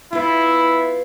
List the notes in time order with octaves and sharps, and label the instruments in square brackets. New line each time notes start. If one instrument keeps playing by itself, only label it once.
[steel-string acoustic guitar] B3 F4 [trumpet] E4